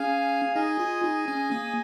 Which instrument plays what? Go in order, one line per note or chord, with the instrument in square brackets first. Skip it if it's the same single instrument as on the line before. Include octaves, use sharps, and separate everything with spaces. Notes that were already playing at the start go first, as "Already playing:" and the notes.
Already playing: [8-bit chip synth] C#4 [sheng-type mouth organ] G#4 F5 G#5
[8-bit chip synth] D#4 [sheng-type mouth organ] G#4 D#5 G#5
[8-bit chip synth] F4
D#4
C#4
A#3